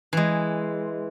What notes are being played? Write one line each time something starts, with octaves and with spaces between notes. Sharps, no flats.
E3 G#3